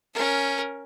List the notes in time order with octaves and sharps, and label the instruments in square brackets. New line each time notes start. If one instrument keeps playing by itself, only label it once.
[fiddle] C#4 A#4